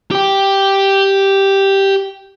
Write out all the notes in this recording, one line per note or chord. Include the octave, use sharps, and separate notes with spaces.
G4 G5